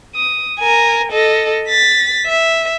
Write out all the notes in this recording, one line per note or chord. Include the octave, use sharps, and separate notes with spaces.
D#6
A#4 G#5
A4 D#5
A6 B6
E5